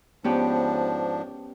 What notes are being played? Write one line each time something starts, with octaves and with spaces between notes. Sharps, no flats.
G#2 F3 B3 C#4 D4 G4